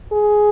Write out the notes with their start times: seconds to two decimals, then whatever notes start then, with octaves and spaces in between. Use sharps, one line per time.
0.12 G#4